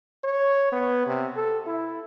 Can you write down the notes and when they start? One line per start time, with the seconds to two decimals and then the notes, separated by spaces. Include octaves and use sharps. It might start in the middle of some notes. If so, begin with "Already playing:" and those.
0.24 C#5
0.72 B3
1.06 C3
1.36 A4
1.67 E4